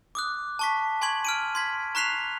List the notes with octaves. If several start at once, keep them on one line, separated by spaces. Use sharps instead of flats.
D6 D#6 F#6
A5 C#6 B6
G#5 C6 C#6 G#6 F#7
F6 D7 D#7
C6 G#6 B6
A#5 C#6 F#6 B6 C7 F7